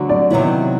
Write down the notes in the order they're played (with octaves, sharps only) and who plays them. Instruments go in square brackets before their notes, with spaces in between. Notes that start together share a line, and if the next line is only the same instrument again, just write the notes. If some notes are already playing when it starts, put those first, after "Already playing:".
Already playing: [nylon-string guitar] D2 D3 F#3
[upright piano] D5
[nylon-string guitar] C3 D#3 F#3 B3 E4 [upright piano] C#5